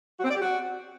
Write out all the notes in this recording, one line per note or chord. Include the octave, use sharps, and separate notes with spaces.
F#4
C4
D5
G4
F#4